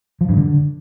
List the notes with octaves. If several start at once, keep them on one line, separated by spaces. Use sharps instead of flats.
F3
G2
D3